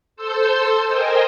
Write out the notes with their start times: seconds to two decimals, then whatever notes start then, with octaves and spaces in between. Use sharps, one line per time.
0.16 A4 C5 C6 E6 G6
0.86 A#4 C5 D#5 G5 G#5